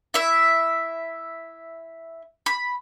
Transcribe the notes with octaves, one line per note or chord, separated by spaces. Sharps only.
E4 E5
B5